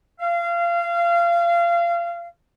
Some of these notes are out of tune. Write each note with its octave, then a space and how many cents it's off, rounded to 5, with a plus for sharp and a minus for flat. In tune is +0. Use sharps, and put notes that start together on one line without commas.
F5 -25